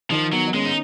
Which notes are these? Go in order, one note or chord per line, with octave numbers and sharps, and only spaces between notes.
D#3 F3
F#3 B3
D#4
G#3 C#4
D#4